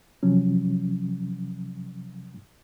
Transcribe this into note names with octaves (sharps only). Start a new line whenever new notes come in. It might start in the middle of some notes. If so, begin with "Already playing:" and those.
C3 F3 F#3 C#4